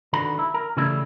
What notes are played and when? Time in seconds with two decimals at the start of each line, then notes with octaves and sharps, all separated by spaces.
0.13 D3 D#3 F#4 B4 A#5 B5
0.39 E4
0.54 A#4
0.77 C#3 E3 G3 A3 E4